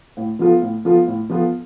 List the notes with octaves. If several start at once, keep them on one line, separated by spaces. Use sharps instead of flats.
A2
F3 B3 F4 A4
A2
F3 B3 F4 A4
A2
F3 B3 F4 A4